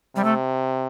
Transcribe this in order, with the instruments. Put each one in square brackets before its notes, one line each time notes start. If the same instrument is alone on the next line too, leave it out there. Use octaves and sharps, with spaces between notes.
[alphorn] C3 [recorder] G3
[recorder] A3